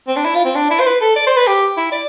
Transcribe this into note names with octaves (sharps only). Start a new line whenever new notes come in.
C4
D4
E4
F4
C4
D4
E4
C5
B4
A4
D5
C5
B4
G4
E4
D5